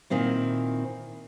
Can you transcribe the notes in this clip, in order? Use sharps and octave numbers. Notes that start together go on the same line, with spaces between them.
A#2 D#3 C4 E4